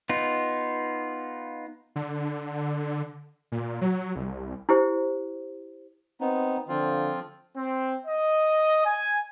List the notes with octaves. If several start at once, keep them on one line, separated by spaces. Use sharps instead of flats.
B3 D#4 F4
D3
A#2
F#3
C2
E4 G4 C5
B3 C4 D#4
D3 F3 C4 F4
C4
D#5
G#5